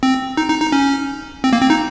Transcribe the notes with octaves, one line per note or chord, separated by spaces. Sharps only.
C4
D#4
D#4
D#4
C#4
C4
A#3
C4
D#4